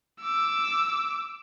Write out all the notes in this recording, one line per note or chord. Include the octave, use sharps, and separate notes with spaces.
D6 E6